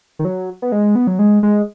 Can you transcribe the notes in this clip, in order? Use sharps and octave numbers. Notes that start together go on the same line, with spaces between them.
D#3
F#3
B3
G#3
B3
F#3
G#3
G#3